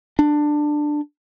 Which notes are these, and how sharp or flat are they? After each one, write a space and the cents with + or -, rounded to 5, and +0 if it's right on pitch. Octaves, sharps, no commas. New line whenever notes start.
D4 +15